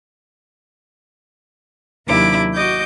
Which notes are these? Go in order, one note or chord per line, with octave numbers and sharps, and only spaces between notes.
D#2 C3 F#3 D4 E4 D6
F#4 D#5 D6 G6